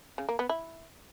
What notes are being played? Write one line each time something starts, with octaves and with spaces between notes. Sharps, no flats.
C#3
A#3
B3
E4